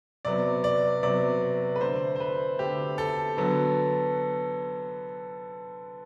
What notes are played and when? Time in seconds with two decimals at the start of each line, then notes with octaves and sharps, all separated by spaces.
0.25 C3 F#3 B3 D5
0.64 D5
1.03 C3 F#3 B3 D5
1.76 B4
1.80 D3 A3 C5
2.16 C5
2.20 B4
2.59 D3 A3 G4
2.98 A4
3.37 D3 F#3 B3